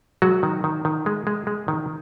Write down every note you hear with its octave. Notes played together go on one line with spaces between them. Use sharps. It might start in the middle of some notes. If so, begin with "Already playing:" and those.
F#3 G#3 F#4
D#3
D#3
D#3
G#3
G#3
G#3
D#3